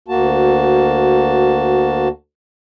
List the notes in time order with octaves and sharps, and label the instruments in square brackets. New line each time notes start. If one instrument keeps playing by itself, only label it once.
[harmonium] D2 A#3 F#4 A5